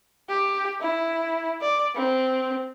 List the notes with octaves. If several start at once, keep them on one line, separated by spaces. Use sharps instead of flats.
G4
E4
D5
C4